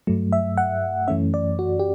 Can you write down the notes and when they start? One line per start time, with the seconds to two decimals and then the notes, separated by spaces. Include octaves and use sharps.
0.07 G2 F#3 A3
0.33 E5
0.58 F#5
1.08 F#2 E3 A3 C#4 E5
1.34 D5
1.59 F#4
1.79 G4